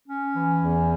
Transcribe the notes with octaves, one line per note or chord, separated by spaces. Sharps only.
C#4
E3
E2